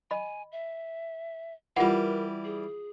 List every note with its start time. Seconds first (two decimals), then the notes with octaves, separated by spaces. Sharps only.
0.11 D#5 G#5 B5
0.52 E5
1.77 E3 G3 F4 A#4 F#5
2.45 G#4